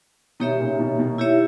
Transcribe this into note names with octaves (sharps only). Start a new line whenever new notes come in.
B2 D#3 A#3 D#4 G4 C#5 E5
A#2 C#3
B2 D#3
B2 D#3
E4 G4 C#5 E5